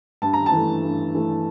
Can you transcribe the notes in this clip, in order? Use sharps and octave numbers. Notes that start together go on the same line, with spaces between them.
G2 A5
A#5
A5
E3 A3
G2
E3 A3